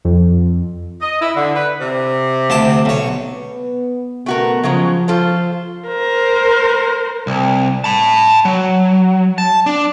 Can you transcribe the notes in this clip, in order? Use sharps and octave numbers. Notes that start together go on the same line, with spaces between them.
F2
D#5
E4
D3
B4
C3
D2 A5 D6
B1 C#5
B3
B2 A3 B3 F#4 A#4
C#3 F3 F#3 G#3
F4 A4 C5
A#4 C5
C2
A5 B5
F#3
A5
D4